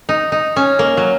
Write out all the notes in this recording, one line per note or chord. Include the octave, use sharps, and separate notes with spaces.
D#4
D#4
C#4
A#3
F#3